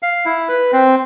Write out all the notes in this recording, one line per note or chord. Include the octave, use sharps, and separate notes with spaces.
F5
E4
B4
C4